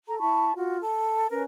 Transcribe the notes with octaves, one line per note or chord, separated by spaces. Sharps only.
A4 A#5
E4 A5 B5 C#6
F4 F#4
A4
C#4 A#4 B4